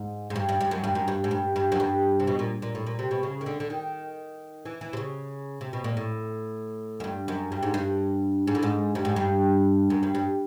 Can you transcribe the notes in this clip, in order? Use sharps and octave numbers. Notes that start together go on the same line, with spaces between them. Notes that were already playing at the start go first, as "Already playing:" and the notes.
Already playing: G#2
G#2
G2
G2
G2
F#2
G2
F#2
G2
G#2
G2
G2
F#2
G2
C3
B2
A#2
A#2
A2
A#2
C3
B2
C#3
D#3
D3
D3
D#3
E3
E3
C3
C#3
C3
B2
A#2
A2
F#2
G2
F#2
G2
G#2
G2
G#2
A2
G#2
G2
G#2
G2
F#2
G2
G2